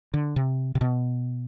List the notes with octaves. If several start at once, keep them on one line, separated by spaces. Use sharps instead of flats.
D3
C3
C3
B2